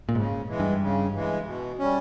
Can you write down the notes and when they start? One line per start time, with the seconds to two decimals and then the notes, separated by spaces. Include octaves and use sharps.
0.09 A#2
0.15 G#2 C#3
0.48 E3 G#3
0.60 G2
0.81 C#3
1.14 E3 G#3
1.46 B2
1.79 G3 C#4